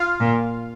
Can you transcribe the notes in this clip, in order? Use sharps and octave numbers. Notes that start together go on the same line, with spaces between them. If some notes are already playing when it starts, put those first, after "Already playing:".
Already playing: F4 F5
A#2